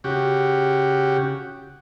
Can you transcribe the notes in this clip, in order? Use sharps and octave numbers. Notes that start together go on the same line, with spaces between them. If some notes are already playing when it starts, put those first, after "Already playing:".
C#3 F#4 G4